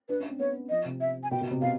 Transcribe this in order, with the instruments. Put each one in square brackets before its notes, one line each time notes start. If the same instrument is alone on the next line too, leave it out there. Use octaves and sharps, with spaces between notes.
[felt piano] D4 [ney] B4
[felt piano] C#4
C4
[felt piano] B3 [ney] C#5
[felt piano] F3 [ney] D#5
[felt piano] C3
[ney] E5
G#5
[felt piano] B2 [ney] G5
[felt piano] B2
C3
[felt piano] B2 [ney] F5